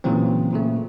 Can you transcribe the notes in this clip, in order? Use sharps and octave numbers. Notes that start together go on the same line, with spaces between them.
A#2 C#3 E3 F#3 C4
A#2 C#3 A3